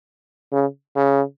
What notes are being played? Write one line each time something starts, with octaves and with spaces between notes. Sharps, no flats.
C#3
C#3